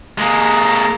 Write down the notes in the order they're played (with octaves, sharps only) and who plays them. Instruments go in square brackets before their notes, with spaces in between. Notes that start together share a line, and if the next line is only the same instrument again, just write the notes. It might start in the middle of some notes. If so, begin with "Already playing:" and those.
[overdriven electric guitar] G#3 A#3